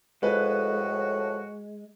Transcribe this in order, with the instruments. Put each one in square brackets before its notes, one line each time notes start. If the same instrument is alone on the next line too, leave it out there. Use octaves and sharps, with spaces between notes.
[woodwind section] A2 F3 [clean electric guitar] G#3 [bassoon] F#4 [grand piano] B4